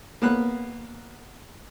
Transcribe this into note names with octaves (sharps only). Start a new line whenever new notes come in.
A#3 B3 F#6